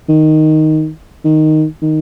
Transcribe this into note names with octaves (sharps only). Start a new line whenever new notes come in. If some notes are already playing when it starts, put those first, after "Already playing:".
D#3
D#3
D#3